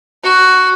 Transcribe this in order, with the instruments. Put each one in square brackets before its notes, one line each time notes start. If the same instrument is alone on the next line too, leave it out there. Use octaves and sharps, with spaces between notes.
[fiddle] F#4